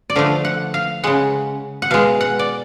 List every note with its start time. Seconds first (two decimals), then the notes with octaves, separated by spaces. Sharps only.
0.10 D5
0.16 D3 F3 A3 F5
0.45 F#5
0.74 F5
1.04 C#3 G#3 F#5
1.82 F#5
1.91 B2 G#3 F5
2.21 F#5
2.39 D5